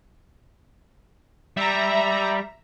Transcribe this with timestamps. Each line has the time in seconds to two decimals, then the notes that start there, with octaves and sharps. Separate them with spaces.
1.57 G3 E5 A#5